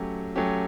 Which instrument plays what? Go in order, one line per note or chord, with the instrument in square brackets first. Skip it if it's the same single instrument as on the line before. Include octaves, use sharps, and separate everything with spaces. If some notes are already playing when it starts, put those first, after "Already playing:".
Already playing: [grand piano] F#3 A3 C#4 G4
F#3 A3 C#4 G4